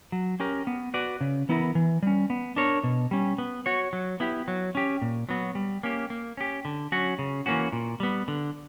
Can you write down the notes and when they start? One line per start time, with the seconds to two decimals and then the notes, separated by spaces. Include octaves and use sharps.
0.12 F#3
0.40 C#4 G4 A#4
0.67 B3
0.94 F#4 B4 D5
1.21 C#3
1.49 E3 B3 E4 A#4
1.75 E3
2.03 G3 C#4
2.30 B3
2.56 D4 A#4 C#5
2.84 B2
3.11 G3 C#4
3.38 B3
3.66 F#4 C#5
3.93 F#3
4.20 B3 E4 G4
4.48 F#3
4.75 C#4 G4
5.02 A#2
5.29 F#3 B3 F#4
5.55 G3
5.83 A#3 C#4 G4
6.10 A#3
6.37 C#4 G4
6.65 D3
6.92 F#3 C#4 F#4
7.19 C#3
7.46 E3 A#3 C#4 F#4
7.72 A#2
8.00 G3 B3
8.28 D3